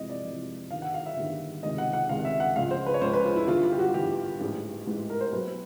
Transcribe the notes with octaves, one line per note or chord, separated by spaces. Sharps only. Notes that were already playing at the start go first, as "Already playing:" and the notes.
Already playing: F2 C3 E3 G#3 D#5
D5
F2 C3 E3 G#3
G1 G2 D#3 F5
F#5
F5
E5
G1 G2 D#3
C#2 C3 D#3 G#3 D#5
F#5
F#5
C#2 C3 D#3 G#3 F5
E5
F#5
C#2 C#3 F3 G#3 F5
C5
B4
C#5
C#2 C#3 F3 G#3 C5
B4
F4
E4
G1 G2 E3 F4
F4
G4
F#4
G1 G2 E3 G4
A1 G#2 E3 G#3
A1 G#2 E3 G#3
A#4
C5
B1 B2 F#3 B4